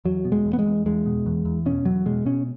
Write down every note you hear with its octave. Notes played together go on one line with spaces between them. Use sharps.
E2 F#3
B2
G#3
E2
B3
G#3
E2
E2 G#3
B2
E2
E2
B2 C#4
E2 F#3
B2 G#3
B2 C#4